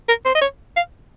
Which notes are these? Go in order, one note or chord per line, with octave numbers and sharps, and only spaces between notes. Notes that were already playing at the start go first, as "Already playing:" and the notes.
A#4
C5
D#5
C#5
F5